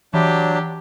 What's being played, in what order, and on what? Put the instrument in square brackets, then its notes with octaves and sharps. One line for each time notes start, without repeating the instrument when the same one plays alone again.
[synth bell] E3 [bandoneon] F#3 D4 [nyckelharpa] G4